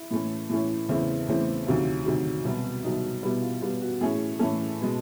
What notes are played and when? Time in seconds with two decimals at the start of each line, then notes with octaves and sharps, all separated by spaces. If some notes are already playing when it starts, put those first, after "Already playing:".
Already playing: E4
0.11 A2 E3 A3 C#4
0.50 A2 E3 A3 C#4
0.89 E2 C#3 E3 A3 C4 E4
1.28 E2 C#3 E3 A3 C4
1.67 D2 C3 D#3 F#3 F4
2.05 D2 C3 D#3 F#3
2.45 C2 B2 F#3
2.84 C2 B2 F#3 D#4
3.23 B2 G3 B3 E4
3.42 F4
3.62 B2 G3 B3 F4
3.81 F#4
4.01 A2 E3 A3 C#4 G#4
4.39 A2 E3 A3 C#4 A4
4.81 B2 G#3